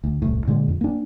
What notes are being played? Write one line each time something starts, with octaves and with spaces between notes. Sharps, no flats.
D2
D#1 C2 A2
A#2 D3 G#3
F2
A#3 D4